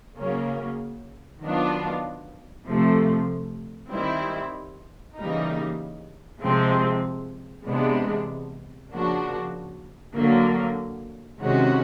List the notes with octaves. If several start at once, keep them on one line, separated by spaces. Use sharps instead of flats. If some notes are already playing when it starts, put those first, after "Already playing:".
C#3 F#3 A#3 C#4
D#3 F#3 B3 D4 F4
C3 F3 A3
D#3 G3 C4 E4
C#3 E3 G3 A#3 D#4
C3 F3 G#3 C4
C3 E3 G#3 B3 D4
C#3 F3 A#3 D4 F#4
D3 F#3 A#3
C3 D#3 G#3 C#4 F#4